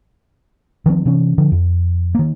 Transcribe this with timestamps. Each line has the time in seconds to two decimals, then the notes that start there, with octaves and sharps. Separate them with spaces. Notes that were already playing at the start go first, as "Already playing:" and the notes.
0.86 D#3 F3 B3 C4
1.06 C3 E3 C#4
1.38 D3 F3
1.52 F2
2.15 D#3 A#3